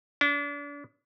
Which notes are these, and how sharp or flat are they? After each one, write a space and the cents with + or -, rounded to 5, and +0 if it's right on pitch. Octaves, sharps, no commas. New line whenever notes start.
D4 -35